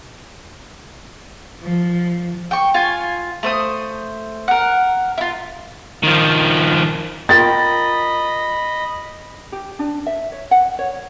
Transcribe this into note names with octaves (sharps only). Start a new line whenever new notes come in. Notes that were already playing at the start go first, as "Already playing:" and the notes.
F3
G5 C#6
F4 G#5
A3 C5 D#6
A#4 F#5
E4 F4
D#3 F3
F4 A#4 D#5 G5 B5 A6
G4
D4
E5
C#5
F#5
C#5